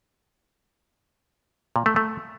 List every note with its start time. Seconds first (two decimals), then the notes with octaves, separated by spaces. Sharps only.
1.76 A#2
1.86 A3
1.96 A3